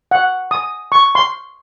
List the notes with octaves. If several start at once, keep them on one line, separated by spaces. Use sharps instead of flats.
F#5
D#6
C#6
C6